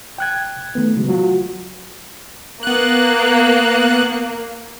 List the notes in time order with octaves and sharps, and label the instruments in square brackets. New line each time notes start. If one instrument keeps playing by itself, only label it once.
[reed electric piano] G5 F#6 G#6
D#3 A3 B3
C#3 F#3 G#3
F#3 F4 F#4
[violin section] A#3 [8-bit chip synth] B3 F#6